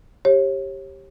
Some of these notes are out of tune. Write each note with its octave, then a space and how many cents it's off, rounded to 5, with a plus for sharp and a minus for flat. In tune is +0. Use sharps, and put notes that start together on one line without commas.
G4 +0 C#5 -35